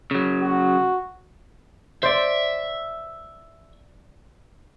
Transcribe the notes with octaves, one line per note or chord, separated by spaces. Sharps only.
C#3 F#3
F#4
C5 D5 E5